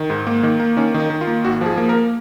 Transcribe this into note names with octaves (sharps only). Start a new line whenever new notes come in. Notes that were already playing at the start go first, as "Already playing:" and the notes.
Already playing: D#3
G#2
A#3
D#3
A#3
D#3 C#4
D#3
D#4
D#3
F4
A#3
G#1 F#4
F3 G#4
A#3
A#4
A#3